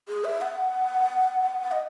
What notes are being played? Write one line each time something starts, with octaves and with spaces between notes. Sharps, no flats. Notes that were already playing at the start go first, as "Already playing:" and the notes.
G#4
E5
F#5
D#5